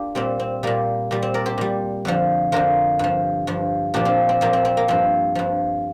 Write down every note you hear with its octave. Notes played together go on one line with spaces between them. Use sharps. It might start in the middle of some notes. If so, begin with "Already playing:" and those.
Already playing: A#3 D4 F4 G4
A#2 G3 C4
C4
A#2 G3 A#3
A#2 G3
C4
A#4 D5
G4 C5
A#2 G3
F2 D3 F3
F2 D3 F3 F4 A#4
G2 F3
G2 F3
A#2 F3 D4 G4
C4 F4
C4
A#2 F3 A#3
C4
C4
A#3
G2 F3 C4
G2 F3